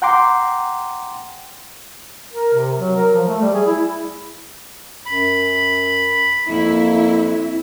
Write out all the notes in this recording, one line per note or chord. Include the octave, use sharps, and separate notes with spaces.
F#5 G5 A#5 C6 D6
A#4
C3
F#3
A#4
F3
A3
G3
G#4
E4
F#2 B5
F2 A#3 E4